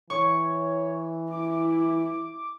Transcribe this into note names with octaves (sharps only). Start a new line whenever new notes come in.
E3 C#5 C#6
E4 D6